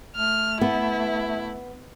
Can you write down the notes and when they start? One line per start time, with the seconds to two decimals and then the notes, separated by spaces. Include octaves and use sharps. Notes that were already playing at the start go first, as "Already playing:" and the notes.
0.16 A3 F6
0.61 B3 E4